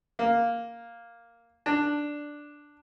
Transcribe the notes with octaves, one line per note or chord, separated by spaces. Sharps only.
A#3
D4